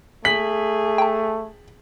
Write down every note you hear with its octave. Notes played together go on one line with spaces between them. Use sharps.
A3 G#4 B6 F#7
G5 A5